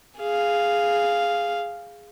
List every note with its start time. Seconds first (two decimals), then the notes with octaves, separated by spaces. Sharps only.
0.19 G#4 F5